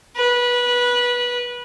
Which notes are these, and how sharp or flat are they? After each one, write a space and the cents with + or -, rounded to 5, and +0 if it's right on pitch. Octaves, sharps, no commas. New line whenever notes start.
B4 -20